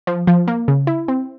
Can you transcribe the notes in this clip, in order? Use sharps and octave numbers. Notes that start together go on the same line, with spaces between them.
F3
F3
A#3
C#3
E4
C4